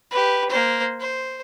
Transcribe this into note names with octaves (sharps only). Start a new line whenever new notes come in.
G4 B4
A#3 C5
C5